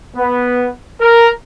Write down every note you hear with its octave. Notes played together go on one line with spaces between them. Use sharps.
B3
A#4